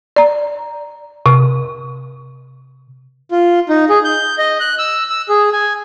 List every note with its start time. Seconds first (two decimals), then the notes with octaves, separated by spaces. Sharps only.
0.16 D5 A#5
1.26 C3
3.31 F4
3.69 D#4
3.90 G#4
4.05 G6
4.38 D#5
4.60 F#6
4.79 E6
5.10 E6
5.29 G#4
5.52 G#5